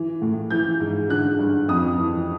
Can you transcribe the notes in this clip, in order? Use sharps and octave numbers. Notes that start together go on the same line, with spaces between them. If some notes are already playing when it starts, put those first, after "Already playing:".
Already playing: E3
A2
E3 G6
G#2
D3 F#6
G2
F2 D#6
E3